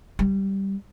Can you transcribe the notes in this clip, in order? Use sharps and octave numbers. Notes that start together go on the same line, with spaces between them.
G3